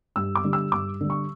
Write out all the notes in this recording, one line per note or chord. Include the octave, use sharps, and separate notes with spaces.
G2 E6
D6
D3 G3
E6
G2 D6
D3 G3
C#6